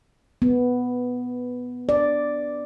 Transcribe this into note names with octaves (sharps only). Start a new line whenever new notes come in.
B3
D5